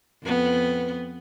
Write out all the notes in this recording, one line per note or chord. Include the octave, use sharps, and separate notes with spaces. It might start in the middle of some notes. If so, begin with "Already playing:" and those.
F2 B3